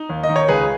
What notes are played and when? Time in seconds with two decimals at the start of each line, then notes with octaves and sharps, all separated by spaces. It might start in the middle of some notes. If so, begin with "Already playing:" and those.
Already playing: D#4
0.09 D#2
0.23 D#5
0.29 D#3
0.36 C#5
0.48 C#2 G#4 B4